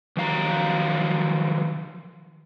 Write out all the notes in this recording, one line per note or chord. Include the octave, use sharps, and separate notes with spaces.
D#3 F3 F#3 F5 A5 A#5